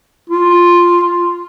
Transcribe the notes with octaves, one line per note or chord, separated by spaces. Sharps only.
F4